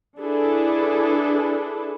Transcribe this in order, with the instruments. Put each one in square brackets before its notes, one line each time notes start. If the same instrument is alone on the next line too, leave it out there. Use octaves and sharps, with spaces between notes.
[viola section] D4 E4 G#4 A4 B4